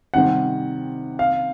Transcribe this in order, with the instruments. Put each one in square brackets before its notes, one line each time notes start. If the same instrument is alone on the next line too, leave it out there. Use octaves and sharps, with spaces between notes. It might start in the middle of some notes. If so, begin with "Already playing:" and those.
[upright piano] C3 D#3 G3 C4 [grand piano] F#5
[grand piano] F5